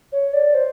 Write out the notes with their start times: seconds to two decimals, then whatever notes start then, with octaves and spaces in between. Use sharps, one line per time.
0.12 C#5
0.33 D5
0.54 C5